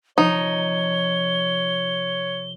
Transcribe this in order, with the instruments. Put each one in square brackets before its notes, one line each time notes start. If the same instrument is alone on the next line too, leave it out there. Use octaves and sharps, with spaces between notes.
[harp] C3 F3 [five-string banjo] D#4 [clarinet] C#5 [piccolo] G7